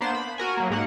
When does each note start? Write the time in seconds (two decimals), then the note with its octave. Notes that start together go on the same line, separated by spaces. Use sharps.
0.01 A#3 B3 D4 C5 E7
0.15 B5
0.38 F#4 A#4 G#5
0.57 F#3 A#3
0.70 G#2 A#3 F#5